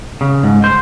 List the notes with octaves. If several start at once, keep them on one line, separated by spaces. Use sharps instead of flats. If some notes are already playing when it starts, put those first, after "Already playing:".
C#3
G#2
C5